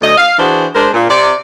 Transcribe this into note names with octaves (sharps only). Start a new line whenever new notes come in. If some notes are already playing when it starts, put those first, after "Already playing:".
D2 D#5
F5
E3 D4 F#4 G#4 C5
G#3 D4 A#4 C5
A#2
C3 D5